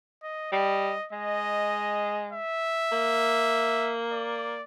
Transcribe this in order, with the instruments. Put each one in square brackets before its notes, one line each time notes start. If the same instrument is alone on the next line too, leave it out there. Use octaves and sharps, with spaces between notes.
[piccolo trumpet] D#5
[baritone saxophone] G3 [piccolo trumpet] D#5
[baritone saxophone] G#3 [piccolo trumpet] D#5
[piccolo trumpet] E5
[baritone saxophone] A#3
[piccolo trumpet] D5